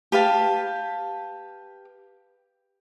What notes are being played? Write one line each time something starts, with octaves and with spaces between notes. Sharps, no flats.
G4 B4 F5 A5